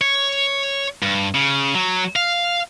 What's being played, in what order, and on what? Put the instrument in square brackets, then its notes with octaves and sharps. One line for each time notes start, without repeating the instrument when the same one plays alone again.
[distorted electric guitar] C#5
G2
C#3
F#3
F5